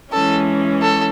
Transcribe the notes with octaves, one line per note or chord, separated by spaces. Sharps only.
E3 G#3 C#4 A4
A4